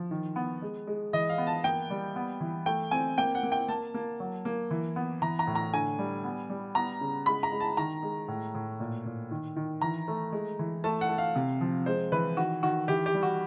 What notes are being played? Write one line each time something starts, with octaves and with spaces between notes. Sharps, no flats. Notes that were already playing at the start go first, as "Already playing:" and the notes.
Already playing: F3
D#3
B3
G#3
G#3
E3 D#5
F5
B3
A5
A#3 G5
G3
B3
E3
A3 G5
C4 G#5
A#3 G5
F#5
A#3
G5
A#3 A5
A#3
F#3
A#3
E3
B3
E3 A#5
A#5
A2
A#5
D3 G#5
G3
B3
G3
B3 A#5
C#3
G#3 B5
A#5
G#3
A5
D#3 A#5
G#3
A2
A2
A#2
A#2
D#3
D#3
E3 A#5
A3
G#3
E3
A3 A5
F#5
A3
F5
C3
F3
G#3 C5
E3 B4
D#3 F#4
D#3 F#4
E3 G4
G4
G3
F#4